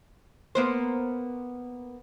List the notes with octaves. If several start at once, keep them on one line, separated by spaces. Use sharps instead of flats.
A#3 B3 C5